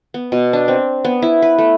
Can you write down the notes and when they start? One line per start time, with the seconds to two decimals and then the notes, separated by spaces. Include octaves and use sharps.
0.14 B3
0.32 B2
0.53 D4
0.68 C4
1.04 B3
1.22 E4
1.42 B4
1.58 A3